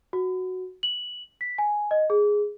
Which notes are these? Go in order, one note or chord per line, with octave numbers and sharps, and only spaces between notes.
F#4
F#7
B6
G#5
D#5
G#4